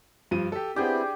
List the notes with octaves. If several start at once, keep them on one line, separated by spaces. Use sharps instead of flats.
G2 F3 D#7
G4 A4
B3 C4 D4 E4 G4 G#4 G5